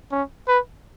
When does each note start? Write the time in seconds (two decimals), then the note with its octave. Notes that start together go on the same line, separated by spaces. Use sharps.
0.12 C#4
0.48 B4